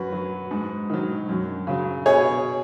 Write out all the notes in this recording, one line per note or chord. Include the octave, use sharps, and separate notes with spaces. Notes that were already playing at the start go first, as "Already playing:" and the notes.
Already playing: F#2 F#4 B4
F#3
G#2
D#3 F#3
F#2
C#3 F#3
B2 G#4 C#5